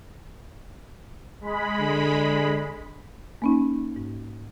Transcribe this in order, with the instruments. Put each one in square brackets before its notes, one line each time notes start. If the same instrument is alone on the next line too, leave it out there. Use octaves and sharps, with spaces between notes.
[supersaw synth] G#3 B5
[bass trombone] D3
[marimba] A#3 C#4 D#4
G#2